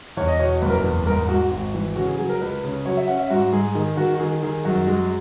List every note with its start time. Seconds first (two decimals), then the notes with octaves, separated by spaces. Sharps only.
0.17 E2 C#5
0.28 D#5
0.39 B2 C#5
0.61 F#1 B4
0.70 A#4
0.78 B4
0.84 E2
1.06 G#2 A#4
1.29 G#2 F#4
1.51 G#1
1.74 E3
1.96 C#3 F#4
2.07 G#4
2.18 F#3 G#4
2.29 A#4
2.41 C#2 B4
2.64 C#3
2.85 F#3 C#5
2.97 E5
3.07 C#4 F#5
3.19 E5
3.30 G#2 F#4
3.53 G#2 G#4
3.75 D#3 G#4
3.97 D#3 F#4
4.14 F#4
4.20 D#3 G#4
4.42 D#3 G#4
4.65 F#2 F#4
4.87 G#3